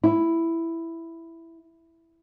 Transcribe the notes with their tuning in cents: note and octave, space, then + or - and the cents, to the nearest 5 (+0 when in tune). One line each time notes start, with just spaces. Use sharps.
E4 +5